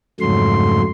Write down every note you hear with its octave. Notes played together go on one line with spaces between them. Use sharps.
F2 G#2 C#3 F#3 A3 C6